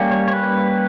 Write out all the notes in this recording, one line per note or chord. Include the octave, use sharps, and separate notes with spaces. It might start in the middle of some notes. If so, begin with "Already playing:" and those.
Already playing: G3 A#3 C#4
C#5
C#5
B4